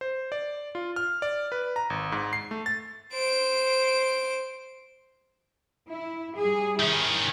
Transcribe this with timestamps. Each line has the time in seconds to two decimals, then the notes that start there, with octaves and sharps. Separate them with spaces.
0.01 C5
0.32 D5
0.75 F4
0.96 F6
1.22 D5
1.52 B4
1.76 A#5
1.90 G#1
2.12 G#2
2.33 C7
2.51 A3
2.66 A6
3.13 C5 D7
5.89 E4
6.35 G3 G#4
6.79 D#3 C#4 E4